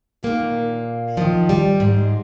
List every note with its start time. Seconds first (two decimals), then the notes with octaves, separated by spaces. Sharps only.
0.23 D#2 A#2 D#3 A#3
1.17 D#2 D#3 F3
1.49 G3
1.80 G#2 G#3